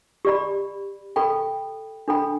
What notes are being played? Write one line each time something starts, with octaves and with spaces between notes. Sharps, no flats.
G4 D5 B5
A4 G5 B5
D4 A4 G5 B5